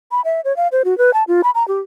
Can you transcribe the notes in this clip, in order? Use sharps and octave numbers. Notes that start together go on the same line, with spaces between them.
B5
E5
C#5
F5
C5
F#4
B4
A5
F4
B5
A#5
G4